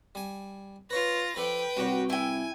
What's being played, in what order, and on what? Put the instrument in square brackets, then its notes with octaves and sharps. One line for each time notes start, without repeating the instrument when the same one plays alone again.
[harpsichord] G3 G#5
[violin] F4 A#6 [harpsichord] B4 C#5
[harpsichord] F3 A4 D5 [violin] B4 G5
[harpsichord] C2 G4 A#5 [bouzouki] F#4 C#5
[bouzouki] E4 G5 [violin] G#5